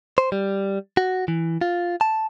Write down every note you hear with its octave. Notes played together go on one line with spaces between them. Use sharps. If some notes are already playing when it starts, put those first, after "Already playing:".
C5
G3
F#4
E3
F4
A5